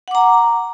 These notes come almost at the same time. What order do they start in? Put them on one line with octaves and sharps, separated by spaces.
F#5 D6 A#5